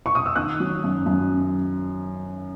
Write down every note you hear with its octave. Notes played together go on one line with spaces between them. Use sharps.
C#6
D#6
E6
D#3 D#6 F#6
F#3
F#2
F#2